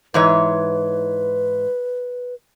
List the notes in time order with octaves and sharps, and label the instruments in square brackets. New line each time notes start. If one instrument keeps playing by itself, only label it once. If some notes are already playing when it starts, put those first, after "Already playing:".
[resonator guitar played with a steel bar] G#2 E3 C#5 [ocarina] B4